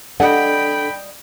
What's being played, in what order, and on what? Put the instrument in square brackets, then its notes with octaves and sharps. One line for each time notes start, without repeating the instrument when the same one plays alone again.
[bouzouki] G3 D#5 [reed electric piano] D4 A4 [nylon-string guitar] F#5 [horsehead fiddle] G5 B5